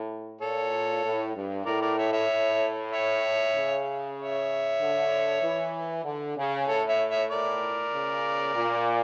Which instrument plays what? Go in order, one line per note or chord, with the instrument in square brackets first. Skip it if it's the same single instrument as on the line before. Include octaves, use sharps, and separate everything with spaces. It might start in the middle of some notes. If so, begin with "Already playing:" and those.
Already playing: [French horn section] A2
[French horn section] A#2 [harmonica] A4 C#5
[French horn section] A2
G2
[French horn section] A2 [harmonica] A#4 D5
[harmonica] A#4 D5
C#5 E5
C#5 E5
[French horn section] A2
[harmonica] C#5 E5
[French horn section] C#3
[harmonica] C#5 E5
[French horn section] D3
E3
D3
C#3
[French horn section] A2 [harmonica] A4 C#5
[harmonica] C#5 E5
C#5 E5
A#4 D5
[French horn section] C#3
A#2